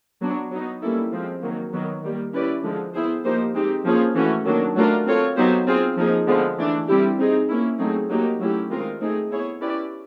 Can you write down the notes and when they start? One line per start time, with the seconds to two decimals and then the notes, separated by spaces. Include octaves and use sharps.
0.21 F#3 B3 D4 F#4
0.51 F#3 B3 D#4
0.81 G3 A#3 C#4 E4 A4
1.12 F3 G#3 C4
1.42 D#3 F#3 A#3
1.72 D#3 F#3 B3
2.03 D#3 G3 A#3
2.33 C#4 E4 G4 B4 D5
2.63 D3 F3 G#3
2.93 B3 E4 G#4 C5
3.23 F3 A#3 D#4 G4 C5
3.54 G#3 C4 D#4 G4
3.84 F3 A#3 C#4 F4 G#4
4.15 E3 A3 C#4 F#4
4.45 D#3 F#3 A#3 D4
4.75 F#3 A3 D4 F4 A#4
5.06 C4 F4 A4 C#5
5.36 F#3 B3 D#4 G4 C5
5.66 C4 F4 G#4
5.97 F3 A#3 D#4 G#4
6.27 D3 F3 G#3 B3
6.57 E3 A3 D4
6.87 G3 C4 E4 G4
7.18 C4 D#4 G#4
7.49 A#3 C#4 E4
7.78 F#3 A3 C4 D#4 G#4
8.09 F#3 A#3 D#4 G4
8.39 F#3 A3 C#4 E4 G4
8.70 D#3 G#3 C4 F4 A#4
9.00 A3 C4 D#4 G#4
9.30 B3 E4 G#4 C#5
9.60 C#4 E4 G4 B4 D5